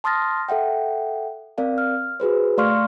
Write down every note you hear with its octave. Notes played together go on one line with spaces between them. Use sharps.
A5 C6 D#6 F6 A6 A#6
A4 E5 F#5 G5
C4 A#4 D5 F5
F6
F#4 G#4 B4 C5
A3 D5 F5 C6 C#6 F6